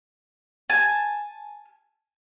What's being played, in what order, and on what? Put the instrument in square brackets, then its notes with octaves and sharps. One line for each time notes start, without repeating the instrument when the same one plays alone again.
[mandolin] G#5 A5